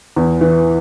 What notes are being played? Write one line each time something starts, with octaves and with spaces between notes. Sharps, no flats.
E2
E3